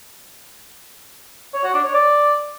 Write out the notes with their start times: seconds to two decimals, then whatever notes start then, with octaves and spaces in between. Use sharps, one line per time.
1.54 C#5
1.64 F#4
1.74 D4
1.84 C#5
1.94 D5